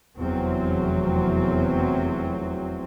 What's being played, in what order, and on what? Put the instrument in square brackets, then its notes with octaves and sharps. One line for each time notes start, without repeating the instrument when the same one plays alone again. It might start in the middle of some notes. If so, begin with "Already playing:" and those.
[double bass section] F1 E2 F#3 C4